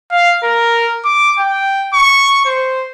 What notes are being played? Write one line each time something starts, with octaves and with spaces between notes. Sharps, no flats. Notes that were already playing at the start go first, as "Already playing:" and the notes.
F5
A#4
D6
G5
C#6
C5